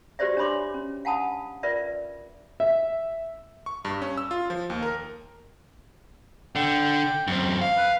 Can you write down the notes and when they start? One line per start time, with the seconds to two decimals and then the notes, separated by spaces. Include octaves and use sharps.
0.19 F#4 G4 B4 C5 D5 E5
0.37 D4 C#5 E5 B5 C6 D6
0.74 C#4
1.05 F5 F#5 G#5 A5 B5 D#6
1.63 F4 A#4 B4 D5 E5
2.60 E5
3.66 C#6
3.85 G2
4.02 C#4
4.18 E6
4.31 F4
4.50 F3
4.70 D#2
4.83 A#4
6.56 D3 G5
7.27 F#2 C4
7.61 F5
7.78 B4